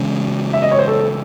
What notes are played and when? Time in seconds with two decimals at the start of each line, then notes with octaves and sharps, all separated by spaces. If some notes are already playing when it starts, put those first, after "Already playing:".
Already playing: C#3 E3 G#3 C#4
0.53 E5
0.62 D#5
0.71 C#5
0.79 C5
0.88 A4